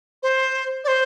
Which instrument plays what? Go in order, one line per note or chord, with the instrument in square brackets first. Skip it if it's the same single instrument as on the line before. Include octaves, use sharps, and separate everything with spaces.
[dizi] C5
D5
C5